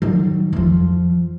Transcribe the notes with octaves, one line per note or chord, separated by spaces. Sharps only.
D#3 F#3
F2 F3